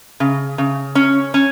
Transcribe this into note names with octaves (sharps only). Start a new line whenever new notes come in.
C#3
C#3
C#4
C#4